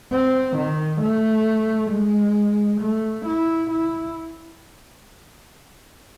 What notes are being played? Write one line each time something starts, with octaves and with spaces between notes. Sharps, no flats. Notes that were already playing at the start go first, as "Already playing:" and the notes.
C4
D#3
A3
G#3
A3
E4
E4